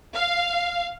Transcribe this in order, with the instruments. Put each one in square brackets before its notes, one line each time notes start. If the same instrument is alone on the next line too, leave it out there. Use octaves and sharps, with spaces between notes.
[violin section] F5